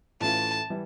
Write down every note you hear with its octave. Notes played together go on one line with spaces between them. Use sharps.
A2 E3 A3 C#4 F4 A5
E3 G3